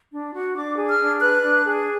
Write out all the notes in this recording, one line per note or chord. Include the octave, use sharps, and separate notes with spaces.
D4
F#4
D4 D6
G#4
F6
D4
B4 F#6
D4
G#4